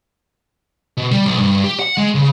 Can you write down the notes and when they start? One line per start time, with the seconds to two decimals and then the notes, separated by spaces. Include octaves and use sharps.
0.97 B2
1.12 G3
1.26 B1
1.38 G2
1.64 G4
1.79 F#5
1.97 G#3
2.15 C#3